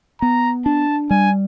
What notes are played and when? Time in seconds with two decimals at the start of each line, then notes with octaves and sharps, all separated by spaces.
0.21 B3 A#5
0.66 D4 A5
1.10 G3 G#5